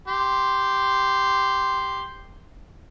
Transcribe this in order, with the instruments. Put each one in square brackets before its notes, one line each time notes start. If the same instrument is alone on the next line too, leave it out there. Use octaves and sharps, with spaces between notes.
[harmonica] G4 C6